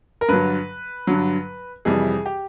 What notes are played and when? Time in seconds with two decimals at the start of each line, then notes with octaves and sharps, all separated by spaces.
0.21 A#4
0.28 G2 D3 F#3 B4
1.07 G2 D3 F#3
1.85 F2 C3 E3 G3 G#4
2.26 G4